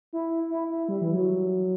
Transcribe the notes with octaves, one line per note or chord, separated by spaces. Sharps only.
E4
E4
E4
G3
E3
F#3